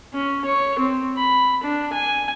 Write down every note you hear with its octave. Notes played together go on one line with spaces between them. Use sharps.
C#4
C#5
C4
B5
D4
G#5